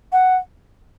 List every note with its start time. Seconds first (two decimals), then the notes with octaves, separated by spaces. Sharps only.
0.12 F#5